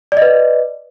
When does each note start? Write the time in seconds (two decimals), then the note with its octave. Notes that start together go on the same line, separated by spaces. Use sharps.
0.12 D5
0.17 D#5
0.22 B4